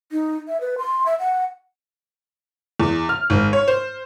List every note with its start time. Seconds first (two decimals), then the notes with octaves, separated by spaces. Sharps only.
0.12 D#4
0.48 E5
0.61 B4
0.78 C6
1.06 E5
1.19 F#5
2.80 E2
3.09 F6
3.30 G#1
3.53 C#5
3.68 C5